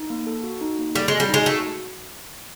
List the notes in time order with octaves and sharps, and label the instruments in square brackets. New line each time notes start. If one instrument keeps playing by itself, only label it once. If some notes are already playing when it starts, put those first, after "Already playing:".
Already playing: [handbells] D#4
A#3
A4
F#4
D#4
A#3
[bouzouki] G3 [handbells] A4
[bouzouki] G#3 [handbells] F#4
[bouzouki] G3
[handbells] D#4
[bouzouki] G#3
[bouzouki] A3 [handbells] F#4